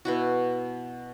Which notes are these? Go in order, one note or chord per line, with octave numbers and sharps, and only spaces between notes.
B2 E4 F#4